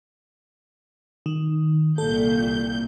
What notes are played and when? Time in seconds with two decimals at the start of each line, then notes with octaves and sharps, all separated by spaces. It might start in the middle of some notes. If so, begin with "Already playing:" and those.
1.26 D#3
1.98 C2 A#2 A4 G6